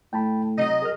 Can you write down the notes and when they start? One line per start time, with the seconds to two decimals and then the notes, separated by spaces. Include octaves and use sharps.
0.13 A2 G5 A5 B5
0.58 C3 F#3 D#5
0.82 G#4 A#4 F6